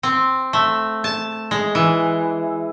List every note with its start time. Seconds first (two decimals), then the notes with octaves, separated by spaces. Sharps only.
0.03 C4
0.53 A3
1.04 A5
1.51 G#3
1.75 E3